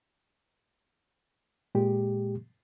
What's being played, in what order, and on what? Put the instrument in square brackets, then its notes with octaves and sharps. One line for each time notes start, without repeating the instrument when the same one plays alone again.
[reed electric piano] A#2 G#3 G4